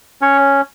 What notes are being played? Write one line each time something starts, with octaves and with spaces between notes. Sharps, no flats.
C#4 C#5